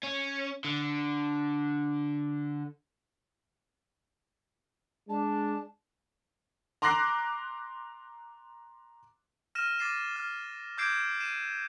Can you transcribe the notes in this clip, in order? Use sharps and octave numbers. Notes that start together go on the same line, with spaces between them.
C#4
D3
G#3 D4 A5
A#5 C6 D6 F#6 A#6 C7
F6 A#6 D#7 E7
D6 A6 A#6 C7 D#7 E7
F6
D6 E6 G6 G#6 C7 D7
C7 D#7 E7